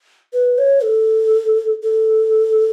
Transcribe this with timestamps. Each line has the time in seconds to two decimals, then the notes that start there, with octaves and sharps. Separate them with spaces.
0.33 B4
0.58 C#5
0.83 A4
1.83 A4